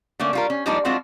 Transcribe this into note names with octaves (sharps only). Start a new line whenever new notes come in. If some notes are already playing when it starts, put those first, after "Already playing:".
D3 A3 A#3 C#4
G3 F4 A#4
C#4
F3 G3 G#3 A#3 D4 D#4
G3 G#3 C4 D4 F4 F#4